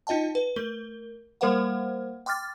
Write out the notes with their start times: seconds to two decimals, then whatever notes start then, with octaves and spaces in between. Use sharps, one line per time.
0.07 D#4 F4 D#5 G5 A5
0.35 B4
0.56 A3 A#4 G7
1.41 G3 A#3 A#4 C5 F5 F#5
2.26 G5 C6 D6 F6 A6